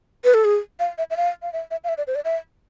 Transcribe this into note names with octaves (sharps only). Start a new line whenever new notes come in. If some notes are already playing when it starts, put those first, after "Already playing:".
B4
A4
G#4
F5
E5
E5
F5
F5
E5
E5
F5
E5
D5
C5
D5
E5